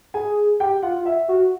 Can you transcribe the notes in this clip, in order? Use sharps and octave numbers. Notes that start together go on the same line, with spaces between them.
G#4 G#5
G4 G5
F4 F#5
E5
F#4